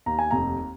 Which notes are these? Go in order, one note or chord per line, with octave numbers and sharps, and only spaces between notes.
D#2 A#5
G#5
F1 A#5